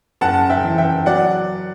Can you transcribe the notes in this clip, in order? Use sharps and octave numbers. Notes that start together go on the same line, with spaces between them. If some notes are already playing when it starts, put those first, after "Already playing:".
F#1 F#5 A5
E5 G5
E3
E5 G5
F#3 D5 F#5